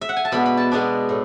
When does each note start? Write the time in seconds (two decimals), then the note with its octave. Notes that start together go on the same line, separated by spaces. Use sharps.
0.01 E5
0.09 F#5
0.17 G#5
0.25 A5
0.32 B2 G#3 B3 D4 B5
0.46 B5
0.57 A5
0.71 B2 G#3 B3 D4
1.09 A2